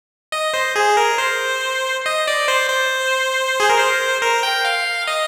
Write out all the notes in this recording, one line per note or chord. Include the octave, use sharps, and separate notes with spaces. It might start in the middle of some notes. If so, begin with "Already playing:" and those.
D#5
C5
G#4
A#4
C5
D#5
D5
C5
C5
G#4
A#4
C5
A#4
G5
F5
D#5